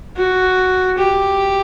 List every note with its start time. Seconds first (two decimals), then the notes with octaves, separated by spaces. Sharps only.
0.17 F#4
0.98 G4